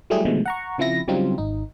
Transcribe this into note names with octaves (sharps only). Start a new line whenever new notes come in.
F#3 G3 A3 E4 G4 G#4
B2 D3 D#3 F3 G#3 A3
F#5 A#5 C#6
C#3 F3 C4 E4 A#6
C#3 F#3 G3 C4 D#4 F4
G#1 D#4